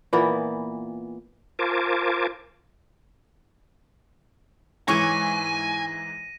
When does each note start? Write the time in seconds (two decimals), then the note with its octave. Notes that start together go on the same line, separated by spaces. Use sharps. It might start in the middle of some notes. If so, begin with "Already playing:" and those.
0.13 A#2 E3 A#3 B3
1.59 F4 A#4 C5 G#5 A5 D6
4.88 G#2 E3 C#5 G#5 C#6 D6 A#6 D#7